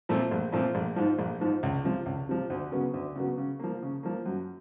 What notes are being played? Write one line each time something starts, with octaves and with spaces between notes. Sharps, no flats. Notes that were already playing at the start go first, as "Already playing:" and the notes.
A#2 F3 A3 C4
A#1
A#2 F3 A3 C4
A#1
G#2 F3
A#1
G#2 F3
C#2
C3 F3
C#2
C3 F3
D2
C#3 F#3 B3
D2
C#3 F#3 B3
C#3
F3 A#3
C#3
F3 A#3
F#2